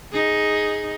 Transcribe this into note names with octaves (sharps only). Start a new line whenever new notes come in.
D#4 G#4